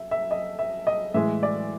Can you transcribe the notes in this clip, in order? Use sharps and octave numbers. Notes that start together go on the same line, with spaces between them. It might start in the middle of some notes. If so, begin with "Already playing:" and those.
Already playing: E5
E5
D#5
E5
D#5
A2 E3 G#3 E5
D5